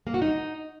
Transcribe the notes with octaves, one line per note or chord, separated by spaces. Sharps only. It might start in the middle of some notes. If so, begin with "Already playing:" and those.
A#3
F#4
D#4